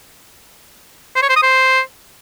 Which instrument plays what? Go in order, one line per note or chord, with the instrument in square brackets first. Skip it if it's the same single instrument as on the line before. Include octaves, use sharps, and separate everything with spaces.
[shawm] C5
C#5
C5
D#6
C5